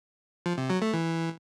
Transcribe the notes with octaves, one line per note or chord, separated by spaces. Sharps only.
F3
C3
F#3
A3
E3